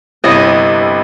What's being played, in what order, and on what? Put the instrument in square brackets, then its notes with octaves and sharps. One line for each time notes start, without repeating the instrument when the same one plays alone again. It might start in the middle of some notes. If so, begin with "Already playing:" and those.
[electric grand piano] G1 C3 E4 [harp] D#5